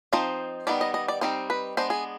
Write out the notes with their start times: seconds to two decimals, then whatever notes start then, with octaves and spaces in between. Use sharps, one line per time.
0.13 F3 C4 D#4 C5
0.67 D#3 G3 B3 D#4 D5
0.81 D#5
0.94 D#5
1.08 D5
1.21 G3 C4 D#4 C5
1.50 B4
1.77 G#3 B3 D4 C5
1.90 G#4